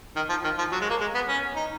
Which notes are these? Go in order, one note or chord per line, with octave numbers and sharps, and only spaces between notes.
D#3
F3
D#3
F3
F#3
G#3
A#3
G#3
B3
C#4
D#4